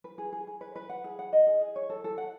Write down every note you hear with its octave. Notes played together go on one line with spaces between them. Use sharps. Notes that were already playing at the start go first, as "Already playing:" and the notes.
B4
G#4
G#4
G#4
B4
B4
F#5
G#4
F#5
D#5
G#4
G#4
C#5
A4
A4
F#5